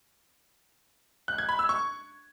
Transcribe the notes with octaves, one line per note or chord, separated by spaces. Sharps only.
F#6
G#6
B5
E6
C#6